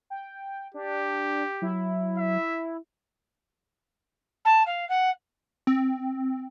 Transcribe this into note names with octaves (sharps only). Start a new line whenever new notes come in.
G5
D4 G4
F#3 E4
E5
A5
F5
F#5
C4